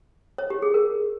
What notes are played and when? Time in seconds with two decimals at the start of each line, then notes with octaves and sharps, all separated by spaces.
0.38 C#5
0.50 G4
0.62 G#4
0.74 A#4